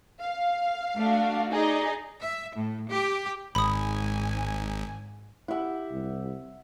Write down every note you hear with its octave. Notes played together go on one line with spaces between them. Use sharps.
F5
A3 D4 F#4
D#4 G#4 D5 D#5
E5
A2
G4
G#1 G#2 G#5 B5 D#6
E4 G4 E5 F#5
C2